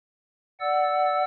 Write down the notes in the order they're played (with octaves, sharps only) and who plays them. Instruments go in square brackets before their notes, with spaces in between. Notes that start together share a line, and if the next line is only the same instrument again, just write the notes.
[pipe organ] D5 F#5 E6